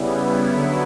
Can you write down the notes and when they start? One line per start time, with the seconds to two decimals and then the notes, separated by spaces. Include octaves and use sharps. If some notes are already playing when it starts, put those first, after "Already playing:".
Already playing: C#3 G3 B3 E4
0.47 D3 F#3 B3 E4